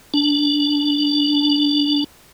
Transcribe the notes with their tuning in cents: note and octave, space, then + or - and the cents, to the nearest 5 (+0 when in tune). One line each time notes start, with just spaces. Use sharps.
D4 -10